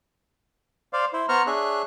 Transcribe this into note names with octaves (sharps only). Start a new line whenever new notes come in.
C5 D5 F5
E4 C5
B3 C5 A#5 C#6 F6
D4 G#4 C#5 E5 F#6